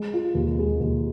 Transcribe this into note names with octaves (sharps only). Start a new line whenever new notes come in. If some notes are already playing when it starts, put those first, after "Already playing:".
Already playing: G#3
F4
D#2
G#3
D#2